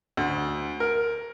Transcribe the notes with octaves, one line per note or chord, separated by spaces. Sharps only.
D2
A#4